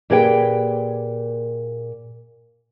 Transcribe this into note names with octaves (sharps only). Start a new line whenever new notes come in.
A#2 G4 G#4 B4 C#5 G5